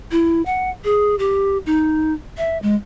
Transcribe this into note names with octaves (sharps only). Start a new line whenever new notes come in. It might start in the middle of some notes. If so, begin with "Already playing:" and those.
E4
F#5
G#4
G4
D#4
E5
G#3